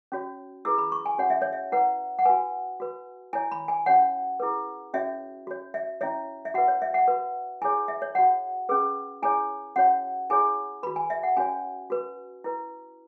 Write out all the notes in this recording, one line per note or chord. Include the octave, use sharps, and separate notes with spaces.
C#4 F#4 C#5
E4 G#4 B4 E6
B5
C#6
G#5
C#4 F#4 C#5 F#5
E5
C#5
E5
E4 B4 F#5
F#5
F#4 B4 G#5
F#4 B4
E4 C#5 G#5
B5
G#5
C#4 F#4 C#5 F#5
E4 G#4 B4
C#4 F#4 C#5 E5
F#4 C#5
E5
C#4 E4 C#5 E5
E5
F#4 B4 F#5
C#5
E5
F#5
F#4 B4
E4 G#4 C#5 G#5
E5
C#5
F#4 C#5 F#5
C#4 G#4 B4
E4 G#4 C#5 G#5
C#4 F#4 C#5 F#5
E4 G#4 C#5 G#5
F#4 B4 B5
G#5
E5
F#5
C#4 F#4 C#5 G#5
F#4 B4
E4 B4